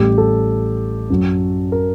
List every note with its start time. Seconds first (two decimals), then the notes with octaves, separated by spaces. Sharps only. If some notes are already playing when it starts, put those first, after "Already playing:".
Already playing: A1 A2 G3 G4
0.18 A4
1.10 F#2 F#3
1.72 A#4